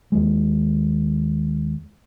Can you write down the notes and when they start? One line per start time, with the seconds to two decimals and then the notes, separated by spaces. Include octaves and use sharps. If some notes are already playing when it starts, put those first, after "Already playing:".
0.12 D#2 G#3